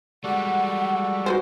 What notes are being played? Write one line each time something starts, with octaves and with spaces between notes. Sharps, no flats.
G3 G#3 F#4 A4 D5 F#5
F#4 B4 C5 C6 D6